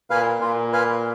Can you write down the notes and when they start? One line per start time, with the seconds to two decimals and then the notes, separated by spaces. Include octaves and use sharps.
0.10 A#2 B4 F5 G#5
0.41 A#2 F4
0.72 B4 F5 G#5